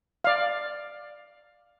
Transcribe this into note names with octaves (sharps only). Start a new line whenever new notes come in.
D5 F5